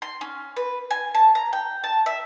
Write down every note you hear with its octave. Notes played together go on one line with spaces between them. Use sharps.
C6
C#4
B4
G#5
A5
A#5
G5
A5
E5